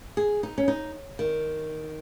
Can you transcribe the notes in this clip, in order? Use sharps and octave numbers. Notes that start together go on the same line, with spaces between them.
G#4
D#4
C#4
D#4
D#3